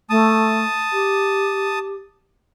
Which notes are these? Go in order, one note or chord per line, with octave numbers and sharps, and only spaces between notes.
A3 A5 D#6
G4